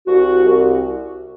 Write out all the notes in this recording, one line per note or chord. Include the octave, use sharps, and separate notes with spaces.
C2 F#4
C2